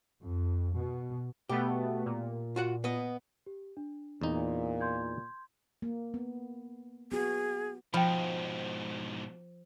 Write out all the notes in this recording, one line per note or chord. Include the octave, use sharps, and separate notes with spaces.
F2
B2
B2 A3 B3 G4
A#2
F4 F#4 F#5
B3 D#5
G4
D4
E2 A#2 D#4
C6 G6 G#6
A#3
B3
B3 F#4 G#4
G#2 B2 F3 G5 B5